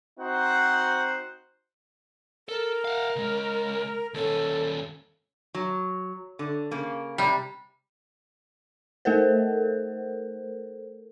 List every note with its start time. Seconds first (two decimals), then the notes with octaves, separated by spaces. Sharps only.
0.20 C4 D#4 F#4 C5 F#5
2.49 A4 A#4
2.85 F5 F#5
3.16 C#2 G#3
4.14 D#2 C#4 A4
5.55 F#3
6.39 D3
6.71 C#3 A#3
7.18 C3 G3 A#5
9.05 A3 A4 A#4 C5